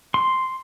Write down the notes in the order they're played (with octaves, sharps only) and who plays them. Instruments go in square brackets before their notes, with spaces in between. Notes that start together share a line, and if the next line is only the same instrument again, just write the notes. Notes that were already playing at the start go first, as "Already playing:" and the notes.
[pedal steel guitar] C6